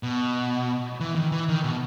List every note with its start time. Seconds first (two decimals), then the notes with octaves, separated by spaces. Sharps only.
0.03 B2
1.00 E3
1.15 D#3
1.32 E3
1.49 D#3
1.64 B2